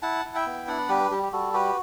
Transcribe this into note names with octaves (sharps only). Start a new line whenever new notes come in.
E4 F#5 A5
E4
E5 G5
B3
D4 D5 F#5
G3 G4 B4
G3 G4
G4
G3 F#4 A4
F#4 G4 B4